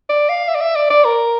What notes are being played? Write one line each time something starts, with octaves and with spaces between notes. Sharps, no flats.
D5
F5
E5
D5
E5
D5
D5
A#4